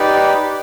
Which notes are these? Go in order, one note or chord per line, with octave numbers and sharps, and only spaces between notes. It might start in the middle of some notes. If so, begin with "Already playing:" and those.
Already playing: D#4 G4 B4 D5